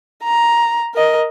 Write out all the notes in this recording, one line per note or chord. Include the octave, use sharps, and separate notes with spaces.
A#5
A#4 D#5